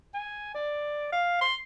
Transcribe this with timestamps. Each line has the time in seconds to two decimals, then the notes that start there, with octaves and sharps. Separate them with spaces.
0.14 G#5
0.54 D5
1.12 F5
1.41 C6